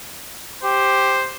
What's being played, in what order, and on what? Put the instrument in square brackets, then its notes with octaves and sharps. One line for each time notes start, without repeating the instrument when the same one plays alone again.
[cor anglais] G4 [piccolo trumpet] C5